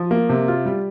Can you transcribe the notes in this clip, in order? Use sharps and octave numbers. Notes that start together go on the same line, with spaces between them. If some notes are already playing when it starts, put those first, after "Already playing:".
Already playing: F3
A#3
C3
F4
G3